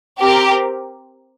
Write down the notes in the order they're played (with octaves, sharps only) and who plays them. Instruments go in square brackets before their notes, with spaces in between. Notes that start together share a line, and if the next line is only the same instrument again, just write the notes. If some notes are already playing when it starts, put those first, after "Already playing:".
[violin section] C4 G4 A#4